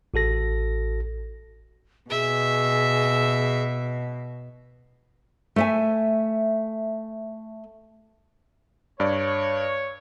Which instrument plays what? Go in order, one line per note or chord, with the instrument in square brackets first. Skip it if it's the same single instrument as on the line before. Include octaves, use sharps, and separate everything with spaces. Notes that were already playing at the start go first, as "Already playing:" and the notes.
[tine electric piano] A1 F#4 A4 A#6
[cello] B2 [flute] G#4 [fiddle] E5
[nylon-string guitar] A3 E5 G#5
[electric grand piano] G2 D5 [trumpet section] C#5